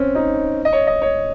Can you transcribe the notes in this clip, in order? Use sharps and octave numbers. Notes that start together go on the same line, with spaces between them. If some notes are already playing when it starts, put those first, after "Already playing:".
Already playing: C4 C#4
D#4
D#5
C#5
D#5
C#5